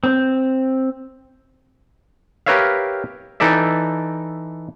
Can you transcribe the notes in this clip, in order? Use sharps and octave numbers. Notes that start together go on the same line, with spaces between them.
C4
G4 A#4 B4 C#5 E5 F5
E3 D#4 A4 D5 E5